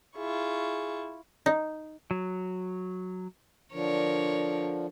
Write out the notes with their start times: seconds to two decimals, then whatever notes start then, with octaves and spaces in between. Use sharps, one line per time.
0.17 E4 F4 G#4 C#6
1.46 D#4
2.11 F#3
3.73 D3 F3 D4 A#4 C#5